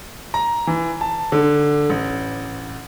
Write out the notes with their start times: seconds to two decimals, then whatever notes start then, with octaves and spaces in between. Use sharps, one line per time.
0.34 A#5
0.67 E3
1.01 A5
1.32 D3
1.90 A1